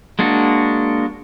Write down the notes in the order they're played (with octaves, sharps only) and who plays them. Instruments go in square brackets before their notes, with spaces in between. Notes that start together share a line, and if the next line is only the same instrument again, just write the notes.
[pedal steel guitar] G#3 A#3 D4 F#4